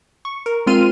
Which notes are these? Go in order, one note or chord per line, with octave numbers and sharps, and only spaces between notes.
C#6
A#4
G#3 C4 F4 C6 F6 D#7